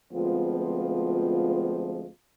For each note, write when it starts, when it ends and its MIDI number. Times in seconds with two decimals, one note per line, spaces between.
0.13 2.07 38
0.13 2.07 53
0.13 2.07 56
0.13 2.07 59
0.13 2.07 60
0.13 2.07 65